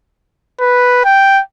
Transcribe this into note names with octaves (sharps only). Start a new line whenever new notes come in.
B4
G5